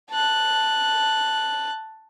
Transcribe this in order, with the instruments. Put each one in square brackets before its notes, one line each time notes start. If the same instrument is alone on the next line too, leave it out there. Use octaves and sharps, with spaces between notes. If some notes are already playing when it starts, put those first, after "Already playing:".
[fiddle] A5 F#6